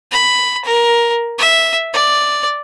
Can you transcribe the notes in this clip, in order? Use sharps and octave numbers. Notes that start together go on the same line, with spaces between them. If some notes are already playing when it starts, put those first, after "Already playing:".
B5
A#4
E5
D5